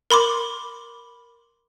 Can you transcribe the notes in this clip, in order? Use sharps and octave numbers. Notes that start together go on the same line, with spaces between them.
A#4 B5 C6 D6